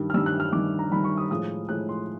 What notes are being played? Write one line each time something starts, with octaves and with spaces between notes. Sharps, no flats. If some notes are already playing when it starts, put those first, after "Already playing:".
Already playing: G2 D#3 G3
F6
G2 D#3 G3 E6
F#6
F6
G2 D#3 G3 D6
A#5
G2 D#3 G3 B5
C#6
D#6
A2 F3 G#3 D#6
A2 F3 G#3 F#6
C6